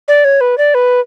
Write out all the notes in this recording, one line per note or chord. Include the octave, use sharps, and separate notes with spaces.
D5
C#5
B4
D5
B4